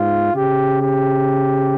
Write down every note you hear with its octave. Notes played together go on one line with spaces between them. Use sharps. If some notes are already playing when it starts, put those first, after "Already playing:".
Already playing: G#2 F4
C#3 G4
G4